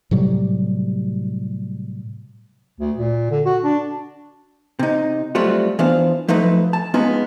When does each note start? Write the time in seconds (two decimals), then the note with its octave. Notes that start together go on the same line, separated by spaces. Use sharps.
0.11 A2 C3 F#3 G3
2.80 D2
2.97 A#2
3.31 D3
3.45 F#4
3.64 D4
4.79 C3 D#4
5.35 F#3 G3 A3 C4 F4 F#4
5.79 E3 B3 D4 F4 C5 F5
6.28 F3 F#3 A3 D#4 B4
6.73 A5
6.94 G#3 B3 C#4 D#4 F4 G#4